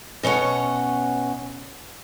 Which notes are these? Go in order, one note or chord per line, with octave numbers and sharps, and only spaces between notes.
B2 C#4 C#5 F#5